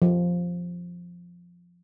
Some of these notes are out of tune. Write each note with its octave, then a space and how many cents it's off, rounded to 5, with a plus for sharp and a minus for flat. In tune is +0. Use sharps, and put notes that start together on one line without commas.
F3 +5